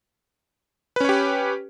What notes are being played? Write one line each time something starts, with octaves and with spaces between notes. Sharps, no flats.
C#4 G4 B4 C#5